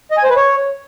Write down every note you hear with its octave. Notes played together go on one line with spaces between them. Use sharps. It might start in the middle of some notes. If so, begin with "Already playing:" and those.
D#5
G#5
C5
B4
C#5